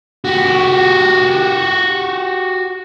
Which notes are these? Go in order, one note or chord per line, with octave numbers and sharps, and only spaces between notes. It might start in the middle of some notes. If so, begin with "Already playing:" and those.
F#4 G4